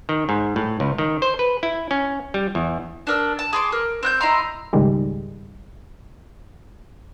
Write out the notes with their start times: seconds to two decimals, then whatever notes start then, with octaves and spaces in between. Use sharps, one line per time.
0.09 D#3
0.29 G#2
0.56 A2
0.80 C#2
0.98 D#3
1.22 C5
1.39 B4
1.63 E4
1.91 C#4
2.34 G3
2.55 E2
3.07 D4 A#4 E6
3.39 A5
3.53 G#4 C6 D6
3.72 A#4
4.03 C4 F#6 G6
4.21 E4 D#5 A#5 C6
4.73 C#2 G#2 D#3 G3 G#3